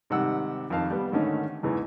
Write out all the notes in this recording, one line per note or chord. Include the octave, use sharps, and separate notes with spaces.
G#2 C3 D#3 G3 F#5 E6
F2 D#3 F5 A5
G3 B3
G#2 D3 D#3 A3 C#4 D#4
E2 G#2 C#3 E3